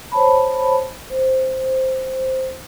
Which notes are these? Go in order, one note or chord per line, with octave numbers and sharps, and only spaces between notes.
C5 C#5 A5 B5
C5